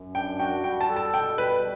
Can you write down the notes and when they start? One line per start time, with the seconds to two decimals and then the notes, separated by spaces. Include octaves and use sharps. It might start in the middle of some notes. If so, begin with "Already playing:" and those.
Already playing: F#2
0.15 D4 G5
0.39 F#4 G5
0.64 G3 G5
0.81 A5
0.89 A4
0.96 A5
1.13 B2 G5
1.38 G3 B4